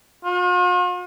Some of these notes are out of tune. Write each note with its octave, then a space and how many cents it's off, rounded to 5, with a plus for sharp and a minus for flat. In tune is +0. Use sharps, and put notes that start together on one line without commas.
F4 +45